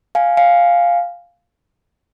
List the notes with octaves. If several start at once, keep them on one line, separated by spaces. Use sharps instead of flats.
F5 G#5
F5 G#5